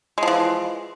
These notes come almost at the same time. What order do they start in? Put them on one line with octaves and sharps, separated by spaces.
G#3 F3 E3